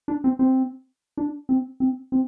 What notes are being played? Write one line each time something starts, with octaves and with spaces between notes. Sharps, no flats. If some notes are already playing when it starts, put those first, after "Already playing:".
D4
C4
C4
D4
C4
C4
C4